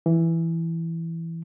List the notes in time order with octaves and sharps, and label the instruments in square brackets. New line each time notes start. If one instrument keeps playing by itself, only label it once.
[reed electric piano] E3